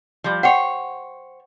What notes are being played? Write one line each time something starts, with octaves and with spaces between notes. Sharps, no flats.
F3 G3
C5 C#5 F#5 G5